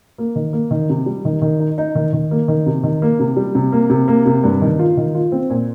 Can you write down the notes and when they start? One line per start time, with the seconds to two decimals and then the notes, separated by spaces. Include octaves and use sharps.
0.18 A#3
0.36 D#3
0.53 A#3
0.71 D#3
0.90 C3
1.06 G3
1.25 D#3
1.42 D#3
1.59 D#4
1.78 D#4
1.95 D#3
2.13 D#3
2.31 A#3
2.48 D#3
2.66 C3
2.83 D#3
3.02 A#3
3.20 C3
3.37 G3
3.55 C3
3.72 A#3
3.90 C3
4.08 A#3
4.26 C3
4.44 G2
4.61 D#3
4.79 F4
4.97 D#3
5.15 F4
5.32 C4
5.50 A#2